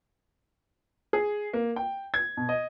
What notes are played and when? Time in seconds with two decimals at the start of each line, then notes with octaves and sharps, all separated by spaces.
1.13 G#4
1.53 A#3
1.76 G5
2.14 G#6
2.37 B2
2.49 D#5